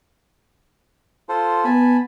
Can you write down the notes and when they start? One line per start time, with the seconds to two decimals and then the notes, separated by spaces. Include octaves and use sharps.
1.29 F4 A4 C5
1.65 B3 G#5 A5 B5